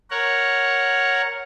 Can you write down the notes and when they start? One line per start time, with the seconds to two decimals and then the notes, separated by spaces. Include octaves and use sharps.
0.11 A#4 C#5 F#5